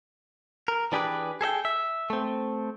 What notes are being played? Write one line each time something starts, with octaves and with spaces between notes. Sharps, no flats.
A#4
E3 D4 G4 G#4 B4
G#4 A4 D#5 G5
E5
A3 C4